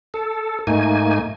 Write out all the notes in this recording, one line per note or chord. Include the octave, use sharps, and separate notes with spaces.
A4
G#2 A3 A#3 D#4 G#5